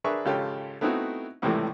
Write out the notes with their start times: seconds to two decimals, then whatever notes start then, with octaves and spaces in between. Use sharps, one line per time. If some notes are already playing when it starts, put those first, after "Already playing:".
0.04 D4 G#4 A#4 B4 E5 C#6
0.25 G#1 C#3 F4 G4 A4
0.81 A3 B3 C4 D#4 E4 F#4
1.42 C#2 A2 C3 E3 G3 A3